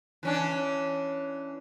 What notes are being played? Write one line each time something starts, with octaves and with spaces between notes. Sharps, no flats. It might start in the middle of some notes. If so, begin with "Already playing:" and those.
E3 C#4 D4